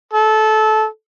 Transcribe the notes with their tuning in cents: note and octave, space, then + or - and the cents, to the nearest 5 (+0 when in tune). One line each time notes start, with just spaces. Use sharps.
A4 -20